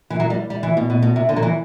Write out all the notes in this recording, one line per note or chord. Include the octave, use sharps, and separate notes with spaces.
E3
F#3
G3
G3
E3
B2
B2
B2
C3
D3
F#3
E3